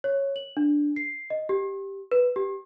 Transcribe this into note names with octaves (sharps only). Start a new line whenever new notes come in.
C#5
F#7
D4
C7
D#5
G4
B4
G4